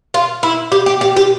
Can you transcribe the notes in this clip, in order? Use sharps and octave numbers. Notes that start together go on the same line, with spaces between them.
F4
E4
G4
G4
G4
G4